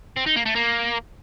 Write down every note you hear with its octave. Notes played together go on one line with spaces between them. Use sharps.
C4
D#4
A#3
A3
A#3